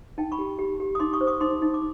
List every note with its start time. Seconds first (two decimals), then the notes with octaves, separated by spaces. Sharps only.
0.18 D#4 G5 A5
0.32 B5 C#6
0.39 G4
0.59 G4
0.80 G4
0.95 D#6
1.00 D#4 C6 D6
1.13 C#6 D#6
1.21 C5
1.27 C#6 D#6
1.41 D#4 C6 D6
1.62 D#4
1.74 D6